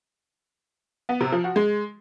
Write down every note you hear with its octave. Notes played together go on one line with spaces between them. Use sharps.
B3
C3
F3
F#4
G#3